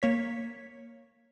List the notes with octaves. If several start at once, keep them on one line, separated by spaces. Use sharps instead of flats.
A#3 C#5 B6